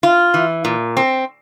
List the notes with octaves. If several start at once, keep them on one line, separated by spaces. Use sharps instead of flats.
F4
E3
A#2
C4